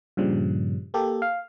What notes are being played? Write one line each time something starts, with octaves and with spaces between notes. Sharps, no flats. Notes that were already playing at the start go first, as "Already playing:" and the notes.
G2 A#2 C#3 F3 G3
A#3 G4 A4
F5